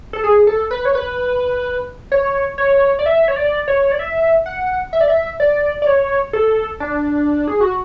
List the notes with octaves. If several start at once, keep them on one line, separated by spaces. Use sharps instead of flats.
A4
G#4
A4
B4
C#5
B4
C#5
C#5
D5
E5
C#5
D5
C#5
D5
E5
F#5
E5
D5
E5
D5
D5
C#5
A4
D4
G#4
F#4